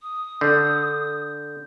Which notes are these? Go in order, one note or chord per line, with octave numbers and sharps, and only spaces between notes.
D#6
D3 G6